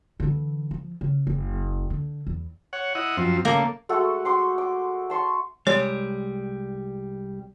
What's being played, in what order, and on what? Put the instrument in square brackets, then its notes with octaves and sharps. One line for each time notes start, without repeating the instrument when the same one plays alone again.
[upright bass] D3 E3
F3
C#3
F#1
D3
E2
[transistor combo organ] C#5 F#5
E4 D#5 F#5
F#2 F3 C4
[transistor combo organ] C#3 A3 [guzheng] A#3
[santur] G#3 A3 F#4 A4
C5 C6 D6
D6
A5 C6 C#6
[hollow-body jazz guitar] C2 G3 G#3 [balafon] C#5